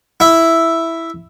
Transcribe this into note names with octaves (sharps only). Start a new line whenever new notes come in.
E4 E5